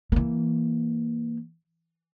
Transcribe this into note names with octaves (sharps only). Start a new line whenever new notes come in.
E3 A#3